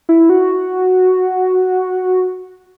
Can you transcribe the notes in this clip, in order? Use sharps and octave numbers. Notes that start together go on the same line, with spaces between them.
E4
F#4